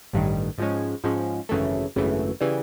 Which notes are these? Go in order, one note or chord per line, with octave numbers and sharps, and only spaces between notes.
A1 G2 D#3
G#2 F3 G#3 C#4
G#2 F3 G#3 C#4
G#1 F#2 C#3 E3 A3
G#1 F#2 C#3 E3 A3
C#3 E3 G3